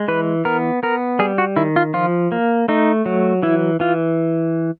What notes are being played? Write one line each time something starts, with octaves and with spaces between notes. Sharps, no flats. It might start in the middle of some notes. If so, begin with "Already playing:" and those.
Already playing: G#3
E3 B4
B3 A#4
B3 A#4
G3 G#4
F#4
D#3 E4
F4
F3 F4
A#3
A3 D#4
F#3
E3 E4
E3 F4